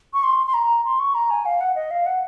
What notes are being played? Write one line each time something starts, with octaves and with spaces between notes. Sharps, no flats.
C#6
C6
C6
A#5
C6
C#6
A#5
G#5
F5
F#5
D#5
F5
F#5